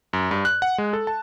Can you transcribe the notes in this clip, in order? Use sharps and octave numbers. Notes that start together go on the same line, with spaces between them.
F#2
G2
F#6
F#5
G#3
A4
A5